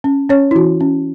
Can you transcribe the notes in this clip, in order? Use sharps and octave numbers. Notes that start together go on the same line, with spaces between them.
C#4
C#4 C#5
E4
E3 F#4
C#4